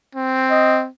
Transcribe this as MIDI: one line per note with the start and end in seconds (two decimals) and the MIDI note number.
0.15 0.88 60
0.50 0.80 75